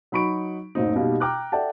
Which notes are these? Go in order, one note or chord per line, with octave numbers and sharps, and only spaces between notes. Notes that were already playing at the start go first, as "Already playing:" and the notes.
F#3 D#4 B5 C#6 D7
F#1 A2 C4 D#4
B2 G3 A#3 D#4 G4
G5 A#5 D6 F6 F#6
A4 D5 E5 F#5 G5 A5